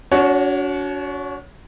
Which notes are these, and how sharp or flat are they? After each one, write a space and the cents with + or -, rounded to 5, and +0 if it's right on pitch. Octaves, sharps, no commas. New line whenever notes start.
D4 -45 F#4 +0 C#5 +0